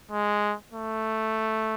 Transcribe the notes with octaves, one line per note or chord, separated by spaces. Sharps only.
G#3
A3